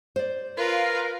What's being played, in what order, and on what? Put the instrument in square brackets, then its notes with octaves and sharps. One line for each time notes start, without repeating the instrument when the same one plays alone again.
[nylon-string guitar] C5 D5
[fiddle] F4 B4 [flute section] A#4 F5